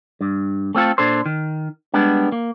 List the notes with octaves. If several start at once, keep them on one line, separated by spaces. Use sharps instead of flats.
G2
A3 C4 F4 A4
A#2 D4 A4 C5
D#3
G3 G#3 B3 D4
A#3